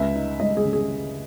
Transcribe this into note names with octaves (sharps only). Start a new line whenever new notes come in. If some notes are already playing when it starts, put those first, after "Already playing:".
Already playing: C#2 E5
D#4
C#2 D#5
G#4
C#3
G#4